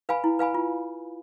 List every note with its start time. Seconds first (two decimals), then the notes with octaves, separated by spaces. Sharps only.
0.09 B4 F5 G#5 B5
0.24 E4
0.39 B4 F5 G#5 B5
0.54 F4